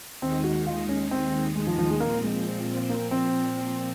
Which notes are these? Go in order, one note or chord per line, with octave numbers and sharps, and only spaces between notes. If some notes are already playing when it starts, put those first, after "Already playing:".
D#2 D#3 G#3 C4 D#4
F#4
F4
C#4
C4
G#3
F3
F3
G#3
A#2 F3 A#3 C4
G#3
A#3
C4